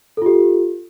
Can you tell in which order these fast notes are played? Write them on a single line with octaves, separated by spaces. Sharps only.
A4 F4 G4